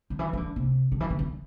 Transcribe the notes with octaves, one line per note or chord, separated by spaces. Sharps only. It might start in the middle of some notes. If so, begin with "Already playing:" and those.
D3
E3
E3
D3
C3
D3
E3
D3
E2